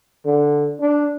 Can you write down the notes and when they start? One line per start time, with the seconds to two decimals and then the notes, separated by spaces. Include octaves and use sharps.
0.25 D3
0.80 D4